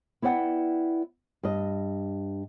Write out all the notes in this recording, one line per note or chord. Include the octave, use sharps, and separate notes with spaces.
B3 E4 C#5 D5 F#5 G5
G2 D#5